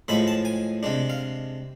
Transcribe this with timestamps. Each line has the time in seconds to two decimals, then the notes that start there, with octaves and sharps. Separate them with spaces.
0.08 A2 F3 G#3 B5
0.28 A5
0.45 G#5
0.83 C3 G#3 D4
1.10 F5